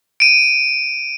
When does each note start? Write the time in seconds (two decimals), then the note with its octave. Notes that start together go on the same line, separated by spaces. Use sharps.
0.20 D7 D#7